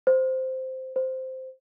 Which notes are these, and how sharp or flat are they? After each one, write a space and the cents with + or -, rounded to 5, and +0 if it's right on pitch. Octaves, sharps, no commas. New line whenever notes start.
C5 -5
C5 -5